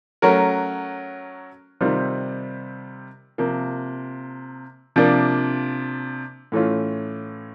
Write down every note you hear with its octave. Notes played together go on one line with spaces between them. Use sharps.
F#3 A3 C#4 F#4 A#4
C3 D#3 G3 C4 F4
C3 F3 A#3
C3 F3 A#3 D4
A2 E3 A3 C#4 F4